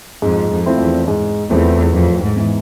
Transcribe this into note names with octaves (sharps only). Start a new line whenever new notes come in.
F2 G#2
F2
F3 A3 C4 E4
E2
G#2
E2 F3 A3 C4 E4
F2 A2
G#2
E3 B3